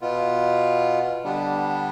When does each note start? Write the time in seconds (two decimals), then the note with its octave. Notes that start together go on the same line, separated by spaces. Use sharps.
0.01 B2 B3 F4
1.24 D3 G3 B3 D4